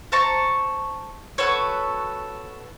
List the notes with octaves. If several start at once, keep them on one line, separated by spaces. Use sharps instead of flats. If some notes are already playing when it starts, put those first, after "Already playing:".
C5 A5 A#5 C#6
F#4 A4 B4 C#5